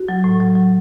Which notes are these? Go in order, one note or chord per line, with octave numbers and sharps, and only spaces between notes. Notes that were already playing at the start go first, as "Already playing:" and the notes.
Already playing: F#4
F#3
A2
F#3
F#3